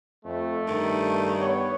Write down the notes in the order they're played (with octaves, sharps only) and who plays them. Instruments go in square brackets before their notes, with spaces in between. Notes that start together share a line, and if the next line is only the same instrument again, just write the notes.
[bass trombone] F2 [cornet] A3
[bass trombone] G2 [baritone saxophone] D#3
[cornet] B3 [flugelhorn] C#5